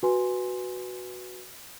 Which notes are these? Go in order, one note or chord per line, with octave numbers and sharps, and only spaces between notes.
F#4 B4 G#5 C6